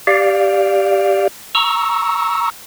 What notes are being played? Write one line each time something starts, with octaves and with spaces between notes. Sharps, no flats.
G4 D5 F5
A#5 C#6 E6